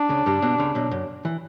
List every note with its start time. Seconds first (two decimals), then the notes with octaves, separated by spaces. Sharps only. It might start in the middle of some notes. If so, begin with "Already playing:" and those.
Already playing: D4
0.09 C#2 C#3
0.26 G2 G3
0.42 B2 B3
0.58 C#2 C#3
0.75 B1 B2
0.91 F#2
1.25 E3